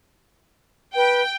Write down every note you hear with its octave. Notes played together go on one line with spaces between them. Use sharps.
B4 G5